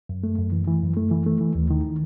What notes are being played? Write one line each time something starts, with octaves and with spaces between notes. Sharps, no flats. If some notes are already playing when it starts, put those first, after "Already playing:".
F#2
A3
F#2
E3
E3
F#2
A3
E3
A3
E3
D#2
D#3